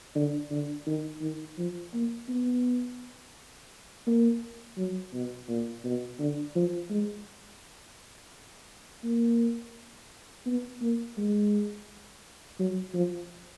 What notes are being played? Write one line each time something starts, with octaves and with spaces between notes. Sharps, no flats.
D3
D3
D#3
D#3
F3
A#3
B3
A#3
F#3
B2
A#2
B2
D3
F3
G#3
A#3
B3
A#3
G#3
F#3
F3